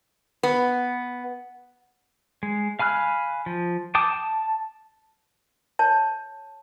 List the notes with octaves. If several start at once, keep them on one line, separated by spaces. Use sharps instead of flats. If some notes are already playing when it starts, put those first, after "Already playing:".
B3
G#3
F5 G#5 B5 F6 F#6
F3
G5 A5 D6 D#6
A5
C#5 A5